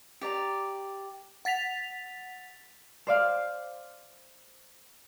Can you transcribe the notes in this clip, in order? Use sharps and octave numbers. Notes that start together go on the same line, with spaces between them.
G4 D5 A#5
F#5 A6 B6 F7
C5 D5 F5